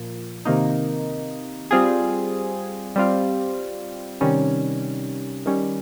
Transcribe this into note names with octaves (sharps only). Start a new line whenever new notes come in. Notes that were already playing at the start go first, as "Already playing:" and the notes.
Already playing: A#2 F3 A#3
C3 D#3 A#3 D#4
G3 C4 F4 G#4
G3 C4 F4
C3 D#3 G3 C#4
D#3 G3 C#4